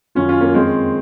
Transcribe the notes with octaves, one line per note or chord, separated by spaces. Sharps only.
F#2 D#3 C#4 F4
C#4 F4
A#3 C#4
F2 D#3 G#3 C4